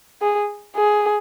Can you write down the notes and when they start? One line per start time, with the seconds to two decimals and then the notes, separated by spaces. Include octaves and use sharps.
0.22 G#4
0.76 G#4